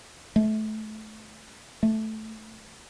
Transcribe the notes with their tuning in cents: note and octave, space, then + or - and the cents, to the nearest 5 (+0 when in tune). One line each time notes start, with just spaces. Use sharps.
A3 -25
A3 -5